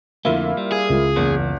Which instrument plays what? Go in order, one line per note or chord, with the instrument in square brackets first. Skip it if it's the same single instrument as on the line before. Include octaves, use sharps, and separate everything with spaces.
[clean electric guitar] F2 D3 A3 [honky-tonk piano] A#3 E4 F4
[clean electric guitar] G3
[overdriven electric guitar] G#4
[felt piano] C#2
[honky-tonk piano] F#1 [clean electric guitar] E2 A#3